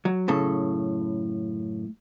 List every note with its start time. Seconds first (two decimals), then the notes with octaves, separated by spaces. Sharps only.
0.05 F#3
0.28 F#2 A2 C#3 A4